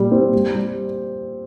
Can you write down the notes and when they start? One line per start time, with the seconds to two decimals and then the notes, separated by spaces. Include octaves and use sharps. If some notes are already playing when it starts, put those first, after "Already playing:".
Already playing: A#2 G3
0.12 C4
0.33 G3
0.55 G3